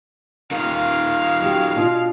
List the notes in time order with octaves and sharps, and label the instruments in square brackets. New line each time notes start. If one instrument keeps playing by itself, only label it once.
[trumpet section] G#3 F5 [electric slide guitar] D#4 F4 A#4
[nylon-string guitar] F#3 G4
B2 D4 F4